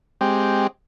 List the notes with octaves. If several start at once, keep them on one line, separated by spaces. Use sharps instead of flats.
G#3 C4 G4